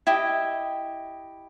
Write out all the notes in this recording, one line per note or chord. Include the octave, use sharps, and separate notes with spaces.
E4 G4 D#5